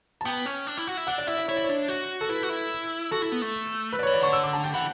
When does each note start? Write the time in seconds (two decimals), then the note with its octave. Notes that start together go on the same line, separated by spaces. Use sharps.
0.21 A5
0.25 B3 G5
0.46 C#4
0.67 D4
0.77 E4
0.88 F#4
0.97 E4
1.07 D4 F#5
1.18 D5
1.27 E4 E5
1.38 D5
1.48 E4 C#5
1.57 D5
1.65 D4 C#5
1.88 F#4
2.21 A4
2.29 E4 B4
2.43 F#4
2.50 E4
3.11 F#4 A4
3.22 E4
3.32 B3
3.42 A3
3.93 B4
3.99 D5
4.03 C#5
4.07 E3
4.13 D5
4.21 D3 C#6
4.33 E6
4.43 D6
4.53 A5
4.64 G5
4.74 E3 F#5